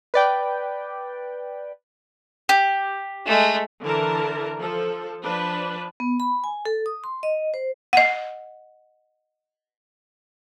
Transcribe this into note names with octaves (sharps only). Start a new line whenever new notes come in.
B4 D5 G5
G4
G#3 A3
D3 E3 A#4 A5
F3 A4
F3 D4 B4
B3
B5
G#5
A4
D#6
C6
D#5
C5
D#5 F#5